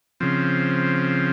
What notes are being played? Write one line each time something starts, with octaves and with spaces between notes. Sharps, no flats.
C#3 F3 C4